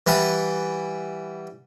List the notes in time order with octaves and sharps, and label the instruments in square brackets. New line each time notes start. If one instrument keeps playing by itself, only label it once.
[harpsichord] E3 G3 B4 F#5